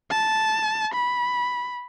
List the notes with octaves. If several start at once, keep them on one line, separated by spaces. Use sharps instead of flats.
A5
B5